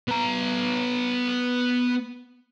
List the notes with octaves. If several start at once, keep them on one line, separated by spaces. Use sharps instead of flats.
B3 A#5